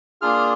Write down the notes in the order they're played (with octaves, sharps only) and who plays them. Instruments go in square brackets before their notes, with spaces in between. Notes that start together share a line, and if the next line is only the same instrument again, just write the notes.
[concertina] A#3 D4 F4 G#4 F6